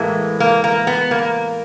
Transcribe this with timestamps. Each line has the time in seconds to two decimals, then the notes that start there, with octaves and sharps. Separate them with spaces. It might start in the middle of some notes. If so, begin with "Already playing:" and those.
Already playing: A2 E3 G#3 A#3
0.40 A#3
0.64 A#3
0.87 B3
1.11 A#3